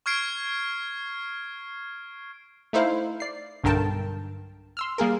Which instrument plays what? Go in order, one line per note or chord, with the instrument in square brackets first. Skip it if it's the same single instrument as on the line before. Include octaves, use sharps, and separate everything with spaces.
[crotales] C#6 F6 G#6 C7 D7
[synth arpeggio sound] A3 D#4 E4 C5 F5
D5 C7
B1 G2 D3 A#4 G5 A5
C6 E6 F6
G3 A#3 G#4 A#4